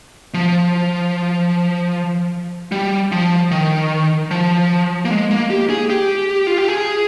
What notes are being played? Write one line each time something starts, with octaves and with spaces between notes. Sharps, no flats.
F3
G3
F3
D#3
F3
A#3
G#3
A#3
G4
G#4
G4
F4
G4
G#4